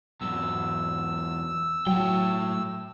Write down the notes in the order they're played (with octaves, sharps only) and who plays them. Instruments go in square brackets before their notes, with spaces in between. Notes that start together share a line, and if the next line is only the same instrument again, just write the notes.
[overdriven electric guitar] E2 F#3 [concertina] E6
[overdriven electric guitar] A2 G5 [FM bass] F#3